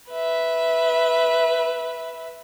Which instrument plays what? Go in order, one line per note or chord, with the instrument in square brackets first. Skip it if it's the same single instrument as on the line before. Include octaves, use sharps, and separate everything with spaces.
[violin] B4 E5